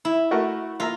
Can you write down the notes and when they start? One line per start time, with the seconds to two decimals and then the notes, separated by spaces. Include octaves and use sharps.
0.05 E4
0.31 A3 F#4 A#4
0.80 A#3 F4 E5 A#5